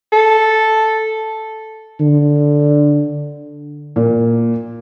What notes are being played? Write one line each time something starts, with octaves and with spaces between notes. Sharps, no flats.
A4
D3
A#2